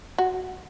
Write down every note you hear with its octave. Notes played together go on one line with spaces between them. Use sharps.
F#4